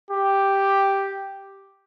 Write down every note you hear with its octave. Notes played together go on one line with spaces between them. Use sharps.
G4